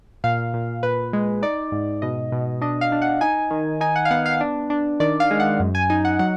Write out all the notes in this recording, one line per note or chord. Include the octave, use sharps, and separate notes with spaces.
A#2 F5
A#2
A#2 B4
G#3
D#4 D5
G#2
B2 D#5
B2
D4 D#5
F5
D4
F#5
D#4 G#5
D#3
D#4 G#5
F#5
F5
B3 F#5
F5
D4
D4
D#3 D5
F5
G#3
F#5
F#2
G#5
D#4 G#5
F#5
F#3 F#5